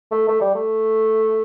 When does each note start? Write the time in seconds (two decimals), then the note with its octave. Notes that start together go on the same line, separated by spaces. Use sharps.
0.11 A3
0.28 A3
0.41 G3
0.55 A3